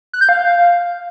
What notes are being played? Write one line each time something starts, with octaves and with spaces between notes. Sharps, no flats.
F#6
G6
F5